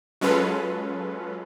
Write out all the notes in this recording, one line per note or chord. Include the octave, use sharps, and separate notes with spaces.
F#3 G#3 C#4 F4 A4 B4